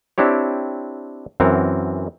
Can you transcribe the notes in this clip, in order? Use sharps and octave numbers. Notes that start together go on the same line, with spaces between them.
C4 D4 E4 G4 C#5
F#2 E3 C4 A#4 F#5 A#5